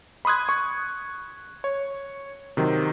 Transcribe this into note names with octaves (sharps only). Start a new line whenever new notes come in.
B5 C6 D#6 F#6 G#6
C#6
C#5
C3 D#3 F#3